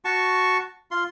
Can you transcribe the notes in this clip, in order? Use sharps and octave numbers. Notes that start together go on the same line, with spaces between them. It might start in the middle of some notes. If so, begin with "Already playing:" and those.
F#4 A5 C#6
F4 C6